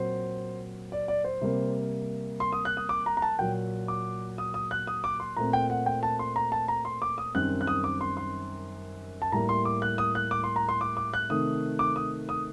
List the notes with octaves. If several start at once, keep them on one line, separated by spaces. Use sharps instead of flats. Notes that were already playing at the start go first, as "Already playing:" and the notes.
Already playing: A#2 F#3 C4 C5
D5
D5
C5
C3 G3 A#3
C6
D#6
F#6
D#6
D6
A#5
A#5
A5
A#2 F#3 A#3 G5
D6
D#6
D#6
F#6
D#6
D6
C6
A#2 A3 C4 A#5
G5
F#5
G5
A5
C6
A#5
A5
A#5
C6
D6
D#6
F#2 D#3 G3 C4 F#6
F#6
D#6
D6
C6
C6
A5
A2 G3 A#3 A#5
C6
D6
F#6
D#6
F#6
D6
C6
A#5
C6
D6
D6
F#6
C3 D#3 A3 C4 D#6
D6
D#6
D#6